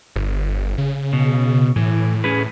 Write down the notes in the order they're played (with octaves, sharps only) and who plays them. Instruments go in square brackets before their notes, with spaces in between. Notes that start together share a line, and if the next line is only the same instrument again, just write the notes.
[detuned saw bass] G1
C#3
[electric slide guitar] B2
[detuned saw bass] A2 [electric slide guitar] E3
[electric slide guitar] C#4 G#4 B4